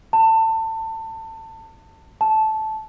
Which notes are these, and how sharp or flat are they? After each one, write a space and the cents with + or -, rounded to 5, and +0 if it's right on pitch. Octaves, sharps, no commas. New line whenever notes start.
A5 +25
A5 -15